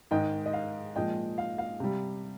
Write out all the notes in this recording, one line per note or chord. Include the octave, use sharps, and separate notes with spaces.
G#2 D#3 G#3 D#5 G5
D#5
F5
A#2 F3 G#3 D#5 G5
F5
F5
C3 G3